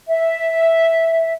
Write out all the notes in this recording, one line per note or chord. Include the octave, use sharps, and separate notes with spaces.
E5